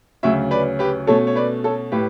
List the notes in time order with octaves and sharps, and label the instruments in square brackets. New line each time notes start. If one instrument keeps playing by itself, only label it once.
[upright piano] D2 C#3 F#3 C#4 C#5 E5
B4 D5
G4 B4
B2 A3 C#4 A4 C#5
C#5
B4 D5
A4 C#5
A2 G4 B4